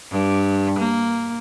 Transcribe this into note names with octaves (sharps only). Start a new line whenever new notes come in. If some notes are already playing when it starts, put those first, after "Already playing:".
G2
A#3